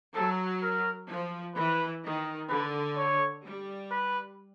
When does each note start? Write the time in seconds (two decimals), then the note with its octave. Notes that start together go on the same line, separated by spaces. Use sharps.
0.15 F#3 A4
0.62 A#4
1.09 F3
1.56 E3 B4
2.04 D#3
2.50 D3 B4
2.97 C#5
3.44 G3
3.91 B4